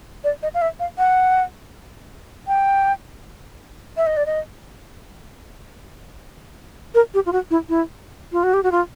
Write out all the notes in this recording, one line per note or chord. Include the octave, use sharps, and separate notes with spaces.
D5
D#5
F5
E5
F5
F#5
G5
E5
D#5
D5
D#5
A#4
G4
F4
F#4
E4
E4
F4
F#4
G4
F#4
F4